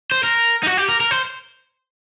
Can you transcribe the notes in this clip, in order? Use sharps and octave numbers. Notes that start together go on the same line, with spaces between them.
C5
A#4
D#4
F#4
G4
A#4
A#4
C5